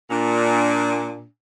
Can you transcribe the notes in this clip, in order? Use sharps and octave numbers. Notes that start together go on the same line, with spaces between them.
A#2 D4